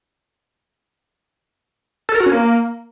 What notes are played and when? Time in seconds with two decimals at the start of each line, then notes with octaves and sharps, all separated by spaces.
2.09 A4
2.15 A#4
2.20 F#4
2.26 C#4
2.32 A#3